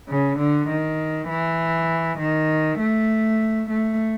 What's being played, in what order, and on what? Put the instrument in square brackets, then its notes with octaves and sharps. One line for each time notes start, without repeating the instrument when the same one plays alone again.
[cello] C#3
D3
D#3
E3
D#3
A3
A3